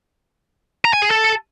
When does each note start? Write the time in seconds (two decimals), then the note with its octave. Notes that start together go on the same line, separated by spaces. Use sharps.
0.85 A#5
0.93 G#5
1.02 G#4
1.11 A4